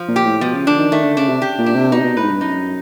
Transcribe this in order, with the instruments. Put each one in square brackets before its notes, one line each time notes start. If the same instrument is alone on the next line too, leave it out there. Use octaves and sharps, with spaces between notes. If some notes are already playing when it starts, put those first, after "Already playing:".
Already playing: [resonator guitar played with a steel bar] F3
[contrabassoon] A#2
[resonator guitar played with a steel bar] G4
[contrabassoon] A2
[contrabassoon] B2 [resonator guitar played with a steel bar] F3
[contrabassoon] C#3
[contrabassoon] D3 [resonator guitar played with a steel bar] D4
[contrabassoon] D#3
[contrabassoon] D#3 [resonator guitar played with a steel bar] A3
[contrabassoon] D3
[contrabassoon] C#3 [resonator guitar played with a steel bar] D4
[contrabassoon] C3
[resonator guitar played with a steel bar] G4
[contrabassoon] A#2
[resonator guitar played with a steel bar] D4
[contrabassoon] C3
[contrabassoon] B2 [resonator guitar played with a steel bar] D#4
[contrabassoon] C3
B2
[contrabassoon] A2 [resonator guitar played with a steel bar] B4
[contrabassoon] G#2
G2
[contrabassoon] F#2 [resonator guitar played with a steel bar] D#4